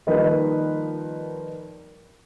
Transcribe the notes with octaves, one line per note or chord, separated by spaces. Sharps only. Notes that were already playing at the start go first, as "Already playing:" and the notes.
D#3 F3 G3 A#3 D#4 B4